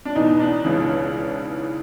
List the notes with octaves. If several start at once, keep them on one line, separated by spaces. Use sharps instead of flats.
D4
E2 B2 D#4
D4
C#2 C#3 E3